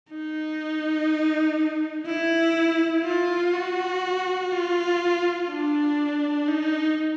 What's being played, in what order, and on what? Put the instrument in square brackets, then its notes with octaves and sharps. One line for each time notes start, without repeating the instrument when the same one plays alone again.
[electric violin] D#4
E4
F4
F#4
F4
D4
D#4